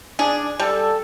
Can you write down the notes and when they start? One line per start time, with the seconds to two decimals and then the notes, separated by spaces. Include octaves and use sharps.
0.19 D4 G#4
0.59 G3 A4